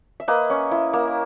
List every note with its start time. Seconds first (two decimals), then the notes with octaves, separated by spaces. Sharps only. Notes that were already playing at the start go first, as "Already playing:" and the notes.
0.20 E5
0.28 A#3 B4 D#5
0.50 C#4
0.71 E4
0.93 A#3